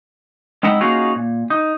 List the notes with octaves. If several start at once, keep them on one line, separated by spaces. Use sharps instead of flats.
G#3 C4 D#4 E4 D#5 F#5
A#3 C#4 D#4 F4 F#4 G#4
A#2
D#4